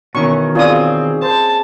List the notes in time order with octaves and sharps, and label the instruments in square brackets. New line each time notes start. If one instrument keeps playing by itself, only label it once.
[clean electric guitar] B2 D#3 E3 [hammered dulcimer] C#4 [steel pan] C#6
[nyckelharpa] C4 [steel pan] F4 D5 D#6 [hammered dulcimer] G#4
[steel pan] C5 [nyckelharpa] A5